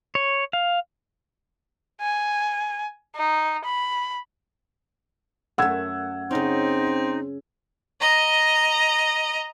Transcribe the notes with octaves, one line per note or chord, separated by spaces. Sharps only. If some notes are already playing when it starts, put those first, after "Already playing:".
C#5
F5
G#5
D#4
B5
F#2 A3 F#5 E6 G#6
C#3 C4 C#4 D#4
D#5 A#5